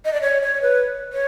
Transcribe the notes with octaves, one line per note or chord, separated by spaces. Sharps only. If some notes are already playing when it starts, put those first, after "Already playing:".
D#5
D5
C#5
C#5
B4
C#5